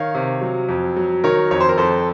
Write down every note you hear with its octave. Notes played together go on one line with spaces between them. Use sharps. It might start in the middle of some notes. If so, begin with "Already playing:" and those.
Already playing: D#3 C#5 F5
C3
F#3
F2
F#3
D#3 A#4 C#5
F2 C#5
C5
A#4
F2 A4 C5